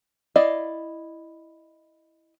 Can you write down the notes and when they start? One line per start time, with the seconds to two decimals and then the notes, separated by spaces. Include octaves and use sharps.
0.36 E4 D5 D#5 F5